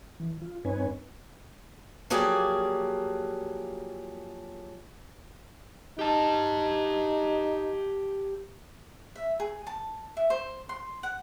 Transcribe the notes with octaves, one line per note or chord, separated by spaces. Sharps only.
E3
F4
G2 C4 D#4 B4 C#5 G#5
F3 F#3 A#3 G4 G#4 D5
D#4 G4 A5
E5
G#4
A5
E5
C5
C6
F#5